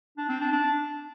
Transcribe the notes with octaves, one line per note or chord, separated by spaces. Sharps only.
D4
C4
D4
D4